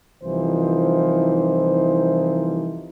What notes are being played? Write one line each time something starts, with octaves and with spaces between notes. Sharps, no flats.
C2 E3 F3 D#4 C5